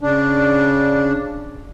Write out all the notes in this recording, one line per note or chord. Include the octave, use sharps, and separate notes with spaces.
C#3 D4